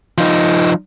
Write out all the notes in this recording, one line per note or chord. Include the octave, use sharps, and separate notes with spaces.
F3 D#4